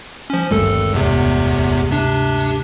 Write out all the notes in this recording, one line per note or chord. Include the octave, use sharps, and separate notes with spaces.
F3 C#4
G#1 D2 G2 G#3 A4
G1 E2 C3
C3 D4